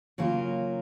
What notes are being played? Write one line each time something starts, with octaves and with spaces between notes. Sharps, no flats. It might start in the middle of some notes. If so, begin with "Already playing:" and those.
C#3 F#3 A#3 F4